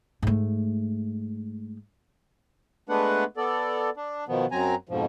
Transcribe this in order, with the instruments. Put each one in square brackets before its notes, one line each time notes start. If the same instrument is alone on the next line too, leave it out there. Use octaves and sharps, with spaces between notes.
[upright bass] G#2 A3
[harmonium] G#3 A3 B3 D4 B4 F#5
B3 A4 D5
D4
B2 D#3 F3 B3
F#2 F#3 C4 G#5 A#5
F2 G#2 B2 F3